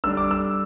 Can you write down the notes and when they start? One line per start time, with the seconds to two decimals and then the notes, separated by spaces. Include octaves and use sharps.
0.04 D3 G3 D4 E6
0.17 D6
0.31 E6